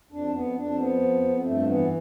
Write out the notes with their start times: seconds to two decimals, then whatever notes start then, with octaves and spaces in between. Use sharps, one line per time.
0.12 F2 D4
0.34 F2 B3
0.56 F2 D4
0.78 F3 B3
1.01 F2
1.23 F2
1.45 G2 A3
1.67 E3 B3